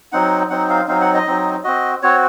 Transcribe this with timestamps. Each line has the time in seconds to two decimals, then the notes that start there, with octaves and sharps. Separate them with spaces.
0.12 F#3 C4 D#4 F#5
0.50 F#3 C4 D#4 F#5
0.70 F5
0.88 F#3 C4 D#4 F5
1.01 F#5
1.14 D#5
1.26 F#3 C4 D#4
1.64 C4 F#4 D#5
2.03 C4 F#4 C#5